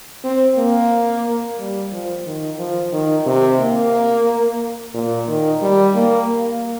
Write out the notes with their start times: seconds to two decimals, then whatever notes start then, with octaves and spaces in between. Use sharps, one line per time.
0.24 C4
0.57 A#3
1.59 G3
1.92 F3
2.26 D#3
2.59 F3
2.92 D#3
3.26 C3
3.59 A#3
4.94 A#2
5.28 D#3
5.62 G3
5.95 A#3
6.29 A#3